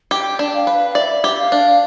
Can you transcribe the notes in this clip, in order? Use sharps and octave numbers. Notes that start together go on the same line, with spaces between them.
G4 G5
D4
F5
B4
F5
D5 E5
G4
F5
D4